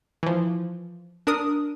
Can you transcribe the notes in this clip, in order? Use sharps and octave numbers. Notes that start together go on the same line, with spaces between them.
E3 F3
D4 A#4 D#6